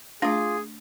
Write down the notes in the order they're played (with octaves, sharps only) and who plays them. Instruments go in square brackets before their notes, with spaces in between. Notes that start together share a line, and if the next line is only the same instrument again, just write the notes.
[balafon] A3 D4 [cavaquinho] F4 D6 [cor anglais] G#4